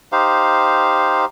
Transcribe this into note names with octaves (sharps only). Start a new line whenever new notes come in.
D#4 G4 C5 F5